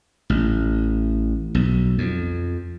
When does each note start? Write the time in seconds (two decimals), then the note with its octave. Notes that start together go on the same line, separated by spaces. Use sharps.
0.30 A1
1.55 B1
1.98 F2